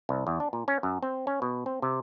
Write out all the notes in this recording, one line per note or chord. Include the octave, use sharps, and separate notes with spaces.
C2
E2
D4
A#2
C#4
F#2
C4
C#4
B2
C4
C3